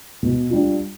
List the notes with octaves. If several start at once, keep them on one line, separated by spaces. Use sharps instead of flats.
B2
G3 D4 F4